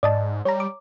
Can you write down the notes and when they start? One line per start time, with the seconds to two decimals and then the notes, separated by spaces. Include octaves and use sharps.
0.03 G#2 D5 D#5 A5
0.45 G3 C#5 A#5
0.60 D6